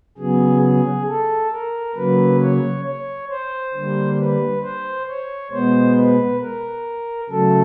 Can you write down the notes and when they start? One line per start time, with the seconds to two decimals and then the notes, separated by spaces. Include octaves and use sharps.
0.18 C#3 F#3 B3 G#4
0.63 G#4
1.08 A4
1.51 A#4
1.96 C#3 F#3 A#3 B4
2.41 C#5
2.85 C#5
3.30 C5
3.74 D3 G3 A#3
4.19 B4
4.63 C5
5.08 C#5
5.51 B2 G#3 B3 C5
5.96 B4
6.41 A#4
7.29 C#3 F#3 A3 A4